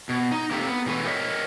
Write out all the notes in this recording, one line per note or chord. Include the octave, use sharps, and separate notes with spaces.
B2
D#4
A#3 C4 G4 A4 D#5 E5
B3
B2 E3 A3 B4
F4 G4 A#4 C#5 D#5 E5